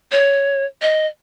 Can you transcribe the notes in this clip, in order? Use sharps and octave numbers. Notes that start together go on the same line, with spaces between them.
C#5
D#5